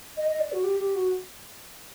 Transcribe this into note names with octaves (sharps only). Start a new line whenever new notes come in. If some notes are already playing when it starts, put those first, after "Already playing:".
D#5
D#5
D5
F#4
G4
G4
F#4